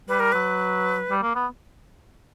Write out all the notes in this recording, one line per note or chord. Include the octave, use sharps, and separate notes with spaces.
G3 B4
A#4
F#3 B4
G3
A#3
B3